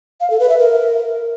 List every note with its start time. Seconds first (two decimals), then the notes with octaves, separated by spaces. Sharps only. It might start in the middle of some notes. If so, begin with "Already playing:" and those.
0.21 F5
0.30 A4
0.40 B4
0.49 E5
0.59 A#4